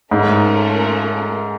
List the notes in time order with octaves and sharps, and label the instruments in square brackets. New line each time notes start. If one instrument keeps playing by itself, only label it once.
[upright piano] G#2 [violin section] A3 C#4 F4 A#4